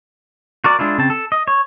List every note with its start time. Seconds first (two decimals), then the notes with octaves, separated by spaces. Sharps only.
0.64 F#4 A#4 D5
0.79 G#3 D4 E4 F4
0.98 C#3 C4 A5
1.10 A4
1.32 D#5
1.48 C#5